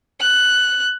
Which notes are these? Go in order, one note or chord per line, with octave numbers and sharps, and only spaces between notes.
F#6